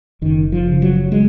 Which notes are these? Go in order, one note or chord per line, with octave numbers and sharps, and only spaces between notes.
F#1 D#3
F3
C#3
F#3
G#3